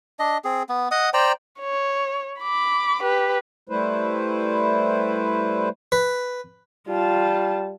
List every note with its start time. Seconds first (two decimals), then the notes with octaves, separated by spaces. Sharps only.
0.19 D4 D#5
0.44 C4 G#4
0.69 B3
0.91 D#5 F#5 D#6
1.14 C5 D5 G5 A#5
1.60 C#5
2.40 B5 D6
3.03 G4 B4
3.69 G3 A3 E4 B4 C5
5.92 B4
6.88 G3 F4 A5